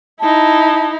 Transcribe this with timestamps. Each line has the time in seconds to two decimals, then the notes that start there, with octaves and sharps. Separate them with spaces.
0.20 D#4 E4 A5